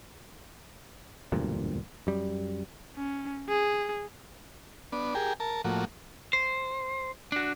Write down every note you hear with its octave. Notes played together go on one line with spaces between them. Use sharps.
E1 D2 G2 A#2
F#2 G3
C#4
G#4
B3 D4
G4 G#4 A#4
A#4 A5
A2 F3 A#3 F#4
C5
D4 F#4